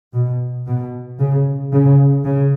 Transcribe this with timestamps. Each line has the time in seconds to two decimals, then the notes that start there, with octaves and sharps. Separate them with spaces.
0.14 B2
0.67 B2
1.19 C#3
1.73 C#3
2.25 C#3